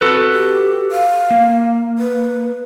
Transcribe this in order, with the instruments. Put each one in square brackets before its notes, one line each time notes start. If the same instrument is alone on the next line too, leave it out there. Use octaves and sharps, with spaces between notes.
[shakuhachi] C4 [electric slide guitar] F#4 A4 B4
[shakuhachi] G4
F5
[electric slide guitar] A#3
[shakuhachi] B4